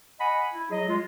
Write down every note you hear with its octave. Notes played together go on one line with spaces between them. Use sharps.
D#5 F#5 G#5 B5
E4
F#3 G#4 D#5
G#3 F4